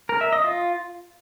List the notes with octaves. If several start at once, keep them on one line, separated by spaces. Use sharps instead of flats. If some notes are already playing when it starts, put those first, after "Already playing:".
A#4
E5
D#5
F4